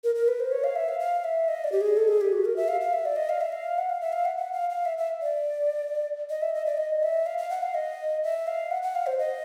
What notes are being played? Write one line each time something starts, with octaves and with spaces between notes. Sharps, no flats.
A#4
A#4
B4
C5
C#5
F5
E5
F5
F5
E5
D#5
D5
G4
G#4
A4
G#4
G4
F#4
A#4
E5
F5
F5
E5
D5
D#5
F5
E5
F5
F#5
F5
E5
F5
F#5
F#5
F5
F5
E5
E5
D5
D#5
E5
D#5
D5
D#5
E5
F5
F5
F#5
F5
D#5
E5
F5
F#5
F#5
F5
C5
D#5